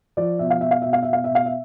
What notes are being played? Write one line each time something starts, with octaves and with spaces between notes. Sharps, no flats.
F3 D5
B2 E5
F5
B2 E5
F5
B2 E5
F5
E5
B2 F5
E5
B2 F5
E5